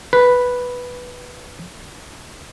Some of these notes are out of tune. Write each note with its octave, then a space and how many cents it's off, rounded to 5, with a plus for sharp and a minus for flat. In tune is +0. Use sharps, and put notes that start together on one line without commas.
B4 -5